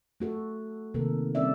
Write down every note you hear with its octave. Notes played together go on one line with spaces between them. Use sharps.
A3 F#4 A4
C3 D#3 A#3 A4 A#4
G3 C4 C#4 D5 E5